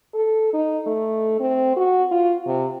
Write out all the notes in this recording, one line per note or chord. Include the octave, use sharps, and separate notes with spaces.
A4
D#4
A3
C4
F#4
F4
C3